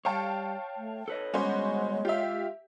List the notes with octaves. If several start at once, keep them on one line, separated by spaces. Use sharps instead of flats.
G3 C#5 F5 G5 A5
A3
A4 B4 C#5 D#5
G3 G#3 B3 C#4 F#4 C5
F4 G4 E5 F5